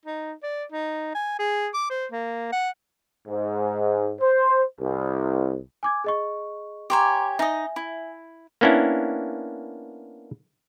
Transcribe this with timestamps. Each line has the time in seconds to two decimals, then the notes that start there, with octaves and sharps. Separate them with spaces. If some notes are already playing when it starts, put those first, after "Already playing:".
0.06 D#4
0.43 D5
0.72 D#4
1.15 G#5
1.39 G#4
1.74 D6
1.90 C5
2.12 A#3
2.53 F#5
3.28 G#2
4.21 C5
4.81 C2
5.83 G#5 D6 G#6
6.04 G#4 D#5 C#6
6.90 G4 C#5 G#5 A#5 C6 D6
7.39 D#4 D#5 E5 G#5
7.76 E4
8.61 A#3 B3 C#4 D4 E4